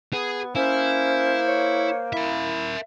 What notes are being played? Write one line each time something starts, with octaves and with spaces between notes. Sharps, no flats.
B3 G#4
A#3 C#4 E4 C5
C#5
E4 A#4 E5